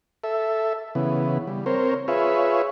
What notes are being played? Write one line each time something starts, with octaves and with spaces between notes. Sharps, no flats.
A4 E5
C#3 E3 B3
G3
C4 A#4 C5 C#5
F4 G#4 B4 C#5 E5